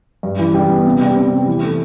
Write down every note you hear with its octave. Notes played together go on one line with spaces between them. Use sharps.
G2
E3
G3
B3
C3
G3
C4
C3
E3
A3